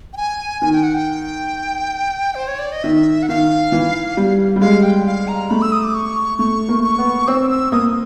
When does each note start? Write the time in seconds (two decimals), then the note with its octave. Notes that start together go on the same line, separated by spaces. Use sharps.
0.13 G5
0.17 G#5
0.62 D#3 G#5
0.73 G5
0.83 F#5
0.94 G5
2.35 C5
2.48 C#5
2.59 D5
2.72 D#5
2.83 D#3 E5
3.23 F#5
3.29 D#3 F5
3.72 E3
4.17 G3
4.56 G3
4.61 G#3 F5
4.83 G5
5.06 F5
5.28 A#5
5.50 A3 B5
5.62 E6
5.72 D#6
5.84 D6
5.95 C#6
6.39 A3 C#6
6.69 A#3
6.83 C#6
6.98 B3
7.28 C4 E6
7.50 E6
7.72 A#3 D#6